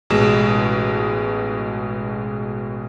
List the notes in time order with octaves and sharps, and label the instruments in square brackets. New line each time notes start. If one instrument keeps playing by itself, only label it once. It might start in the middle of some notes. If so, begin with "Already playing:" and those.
[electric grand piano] A1 B2 G#3 E7